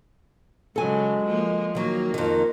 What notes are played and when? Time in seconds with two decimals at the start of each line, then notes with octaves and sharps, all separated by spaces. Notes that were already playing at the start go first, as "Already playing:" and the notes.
0.76 C#3 F#3 G#3 A4 G#5
1.25 F3 A#3
1.75 D#3 F#3 A#3
2.14 F2 D#3 A#4